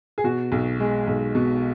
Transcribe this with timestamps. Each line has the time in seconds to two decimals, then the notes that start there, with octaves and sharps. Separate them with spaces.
0.18 G#4
0.24 B2 F#4
0.52 B1
0.80 G#3
1.07 B1
1.35 B2